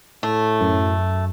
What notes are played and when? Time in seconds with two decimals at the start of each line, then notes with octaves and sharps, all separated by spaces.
0.23 A2 A3
0.61 F#2